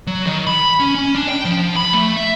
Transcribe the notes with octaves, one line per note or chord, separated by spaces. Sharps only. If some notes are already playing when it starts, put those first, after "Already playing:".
F#3
D#3
B5
C#4
C#4
D4
G5
F3
B5
A3
E5